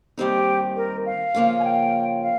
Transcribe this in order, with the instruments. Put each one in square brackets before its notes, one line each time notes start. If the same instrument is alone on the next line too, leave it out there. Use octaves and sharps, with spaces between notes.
[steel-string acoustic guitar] D#2 D#3 G3 C4 D#4 [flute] G4
[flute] A#4
F5
[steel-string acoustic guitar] C#3 F3 A#3 C#4 F4
[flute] G#5
G5
F5